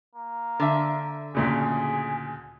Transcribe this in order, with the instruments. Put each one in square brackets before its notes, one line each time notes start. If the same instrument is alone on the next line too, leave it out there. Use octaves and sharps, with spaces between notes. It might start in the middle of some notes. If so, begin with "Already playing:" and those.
[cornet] A#3
[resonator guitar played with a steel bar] D3 E5
[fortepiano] D2 A#2 C#3 [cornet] G#4